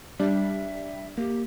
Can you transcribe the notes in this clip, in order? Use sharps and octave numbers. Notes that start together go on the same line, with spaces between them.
G3 D4 E5
A#3 G4